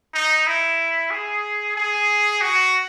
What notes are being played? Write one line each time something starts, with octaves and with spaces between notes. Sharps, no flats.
D#4
E4
G#4
G#4
F#4